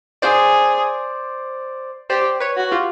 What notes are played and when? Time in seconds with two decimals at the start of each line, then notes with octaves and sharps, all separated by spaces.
0.22 G#4 C5 D5
2.10 G4 C5 D5
2.40 B4 C#5
2.57 F#4
2.71 F4 G4